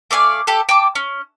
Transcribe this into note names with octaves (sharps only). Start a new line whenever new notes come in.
A3 D5 F5 G#5
G4 A4
G5 A5 D6
C#4